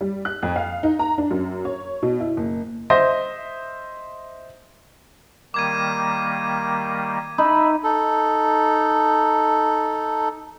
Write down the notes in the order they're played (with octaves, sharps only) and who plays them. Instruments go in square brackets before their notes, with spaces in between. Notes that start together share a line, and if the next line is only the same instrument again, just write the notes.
[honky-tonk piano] G3
F#6
F2
F5
D#4
A#5
D4
F#2
C#5
B2
E4
F#1
[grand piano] C5 D#5 E5 A#6
[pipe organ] D#3 G3 A#3 [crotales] D6 G#6 D#7
[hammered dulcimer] D#4 [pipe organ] E5 [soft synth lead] B5
[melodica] D#4 A4